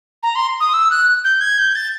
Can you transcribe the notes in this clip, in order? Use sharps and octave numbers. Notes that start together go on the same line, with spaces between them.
A#5
C6
D#6
E6
F#6
G6
G#6
G6
A6